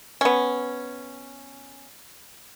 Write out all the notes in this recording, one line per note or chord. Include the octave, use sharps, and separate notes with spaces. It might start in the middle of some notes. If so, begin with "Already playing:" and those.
B3 C#4